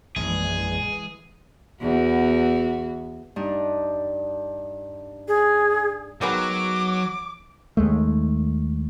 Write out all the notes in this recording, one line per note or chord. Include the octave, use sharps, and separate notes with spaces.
A#1 F#2 E3 G#3 G#4
E2 F#4
G2 D4 D#4
G#4
D#3 F#3 G#3 B3 D6
D#2 G#3 A3